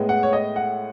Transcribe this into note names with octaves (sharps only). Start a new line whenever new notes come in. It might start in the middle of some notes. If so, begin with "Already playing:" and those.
Already playing: A2 G#3 B3
F#5
C#5
D#5
F#5